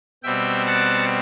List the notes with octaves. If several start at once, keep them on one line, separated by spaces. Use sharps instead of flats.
B2 G3 C4 E5 G5
F#5 A5